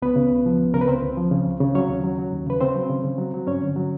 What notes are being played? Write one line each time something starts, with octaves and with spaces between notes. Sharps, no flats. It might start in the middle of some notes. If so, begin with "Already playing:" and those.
C#2 B3 B4
C#3
C#2
F3
C#2
C#3 A#4
B4
C#2 C4 C5
C#2
F3
C#3
C#2
C#3
F#3 C#4 C#5
D#2
F#3
F#3
D#2
C#3 B4
C#3 C4 C5
F#3
C#3
C#3
F#3
F#3
G2 C#4 C#5
D3
F#3